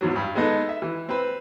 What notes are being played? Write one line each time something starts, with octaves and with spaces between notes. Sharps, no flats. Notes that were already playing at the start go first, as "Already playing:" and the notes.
E2 G#2 F#3
G2
G#3 B3 D#4 A4
E5
E3
C4 B4